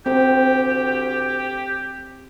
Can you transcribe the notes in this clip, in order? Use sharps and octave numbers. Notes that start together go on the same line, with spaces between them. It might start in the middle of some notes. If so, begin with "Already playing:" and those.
D2 C4 G4